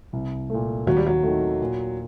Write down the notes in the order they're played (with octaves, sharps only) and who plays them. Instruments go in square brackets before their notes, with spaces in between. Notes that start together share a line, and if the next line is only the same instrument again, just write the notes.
[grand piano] C2
A#2 A3
[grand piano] D#2 [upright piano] F#3
[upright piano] G3
F#3
[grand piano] D#3 A3
A#2